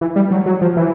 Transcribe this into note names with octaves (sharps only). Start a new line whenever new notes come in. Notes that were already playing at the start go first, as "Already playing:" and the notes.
E3
G3
F#3
F#3
F3
E3